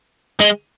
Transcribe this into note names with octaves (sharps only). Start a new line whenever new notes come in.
G#3